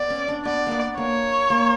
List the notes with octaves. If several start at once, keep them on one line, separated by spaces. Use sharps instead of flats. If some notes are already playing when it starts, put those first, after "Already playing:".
Already playing: B3 D5
C#4
D4
B3 D5
A#3 B3
A#3 C#5
A#3